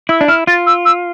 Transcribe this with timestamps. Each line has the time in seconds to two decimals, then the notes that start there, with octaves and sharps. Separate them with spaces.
0.09 E4 E6
0.21 D4
0.28 E4 F6
0.47 F4 A6
0.66 E6
0.85 E6